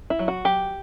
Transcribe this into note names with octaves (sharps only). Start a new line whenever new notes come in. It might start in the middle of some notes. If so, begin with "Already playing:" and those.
E4
F#3
F#4
F#3 G4